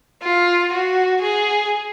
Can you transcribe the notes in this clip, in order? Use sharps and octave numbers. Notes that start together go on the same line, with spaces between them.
F4
F#4
G#4